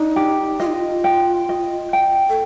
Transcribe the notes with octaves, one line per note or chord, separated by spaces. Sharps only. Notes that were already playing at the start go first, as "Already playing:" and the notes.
Already playing: D4 D#4
G4
F4 D#5
D#4
F4
G5
D#5
G5
A4